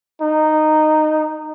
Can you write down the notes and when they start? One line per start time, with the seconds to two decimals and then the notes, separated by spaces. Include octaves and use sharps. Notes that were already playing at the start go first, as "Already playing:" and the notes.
0.22 D#4